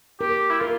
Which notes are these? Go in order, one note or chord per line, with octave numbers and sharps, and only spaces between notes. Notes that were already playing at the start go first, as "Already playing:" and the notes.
G4 A#4
E4
F4 A#4